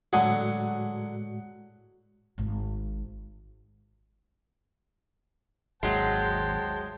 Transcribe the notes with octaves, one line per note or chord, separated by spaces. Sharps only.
A2 D3 F#3 G#3 F#4 G#4 F#5
G#1 G#2
G#1 D#2 F#3 G#3 C5 G5 A5